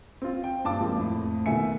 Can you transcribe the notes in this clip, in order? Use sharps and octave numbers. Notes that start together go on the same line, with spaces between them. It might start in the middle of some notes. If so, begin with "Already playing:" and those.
C4 F4
G5
G2 A#2 A5 D6
F3 G#3 A#3 C4
F2 A2
B2 D#3 A3 E5 G#5 C#7